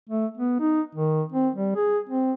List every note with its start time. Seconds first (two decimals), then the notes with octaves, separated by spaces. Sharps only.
0.09 A3
0.37 B3
0.60 D#4
0.95 D#3
1.32 C4
1.55 G3
1.76 G#4
2.09 C4